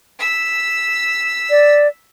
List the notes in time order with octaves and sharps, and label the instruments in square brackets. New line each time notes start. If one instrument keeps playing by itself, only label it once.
[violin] E6 B6
[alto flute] D5